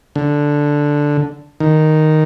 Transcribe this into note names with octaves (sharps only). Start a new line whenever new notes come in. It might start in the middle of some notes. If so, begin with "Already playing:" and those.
D3
D#3